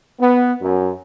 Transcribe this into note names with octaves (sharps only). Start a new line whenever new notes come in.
B3
F#2